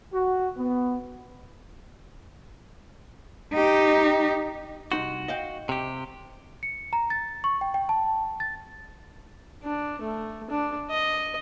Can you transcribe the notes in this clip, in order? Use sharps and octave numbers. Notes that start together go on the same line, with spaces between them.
F#4
B3
D#4 G4
C2 D#4 F#4 C6
D#5 F5 G5
C3 G4
C#7
A#5
A6
C#6
G5
G5
A5
A6
D4
A3
D4
D#5